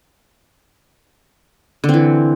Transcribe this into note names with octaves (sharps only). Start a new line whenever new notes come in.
D3 E3 C4